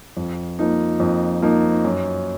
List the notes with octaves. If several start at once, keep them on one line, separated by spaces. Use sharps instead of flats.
F2
F3 A#3 D#4
F2
F3 A#3 D#4
F#2